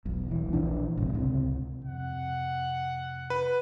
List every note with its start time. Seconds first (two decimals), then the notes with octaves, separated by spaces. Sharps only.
0.05 E1 B1
0.28 D#1 E3
0.53 A#1 E3 D4
0.97 A#1 G#2 C3
1.13 C#2 C3
1.84 F2 C3 F#5
3.30 B4